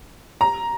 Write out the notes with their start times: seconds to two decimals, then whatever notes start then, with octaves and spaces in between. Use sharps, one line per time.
0.41 A#5